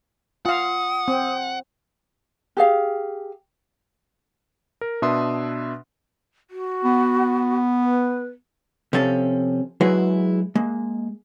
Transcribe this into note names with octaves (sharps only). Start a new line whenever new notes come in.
F4 F5 F#5 D#6
C4
G4 G#4 F5
A#4
B2 D4 B4 E5 C6 D#6
F#4
B3
B4
C3 F3 C#4 A4
F#3 G#3 E4 F#4 G#4 B4
G#3 A#3